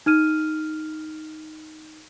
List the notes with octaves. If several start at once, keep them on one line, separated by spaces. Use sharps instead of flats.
D#4 F6 D#7